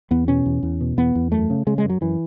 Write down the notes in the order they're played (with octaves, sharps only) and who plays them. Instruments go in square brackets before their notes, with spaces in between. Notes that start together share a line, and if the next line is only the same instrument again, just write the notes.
[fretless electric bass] E2 B3
B2 C#4
E2
E2
B2
E2 B3
E2
F#2 A3
C#3
C#3 G#3
G#3
F#2
F#3
F#2 E3